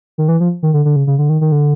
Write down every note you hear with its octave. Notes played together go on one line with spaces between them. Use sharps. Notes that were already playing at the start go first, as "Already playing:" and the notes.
D#3
E3
F3
D#3
D3
D3
C#3
C#3
D3
D#3
D#3
D3